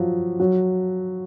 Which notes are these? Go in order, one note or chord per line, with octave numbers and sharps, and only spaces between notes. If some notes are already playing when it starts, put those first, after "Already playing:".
Already playing: F3 F#3
F#3